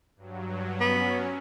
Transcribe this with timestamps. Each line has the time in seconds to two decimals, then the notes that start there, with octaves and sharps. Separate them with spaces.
0.16 G2 F#3
0.80 F#3 B3 C#4